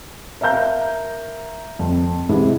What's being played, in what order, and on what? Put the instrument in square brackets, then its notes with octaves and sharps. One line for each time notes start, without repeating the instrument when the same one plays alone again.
[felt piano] A#4 E5 F5 A#5 G6
F2
G#2 C3 E3 E4 G#4